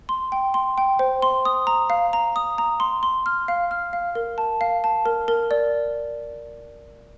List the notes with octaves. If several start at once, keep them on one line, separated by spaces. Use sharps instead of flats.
C6
G5
C6
G5
C5
C6
D#6
A#5
F5
A#5
D#6
A#5
C6
C6
F6
F5
F6
F5
A#4
A5
F5
A5
A#4
A#4
D5